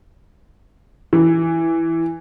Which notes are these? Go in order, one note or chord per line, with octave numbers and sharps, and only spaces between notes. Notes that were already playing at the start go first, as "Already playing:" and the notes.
E3